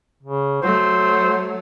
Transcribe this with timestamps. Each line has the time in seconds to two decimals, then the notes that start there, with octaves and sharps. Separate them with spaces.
0.23 C#3
0.62 F#3 A3 C5